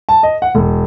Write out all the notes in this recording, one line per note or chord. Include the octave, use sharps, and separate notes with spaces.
A5
D#5
F#5
E1